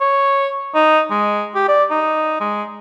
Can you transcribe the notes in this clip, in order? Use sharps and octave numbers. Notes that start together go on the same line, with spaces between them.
C#5
D#4
G#3
G4
D5
D#4
G#3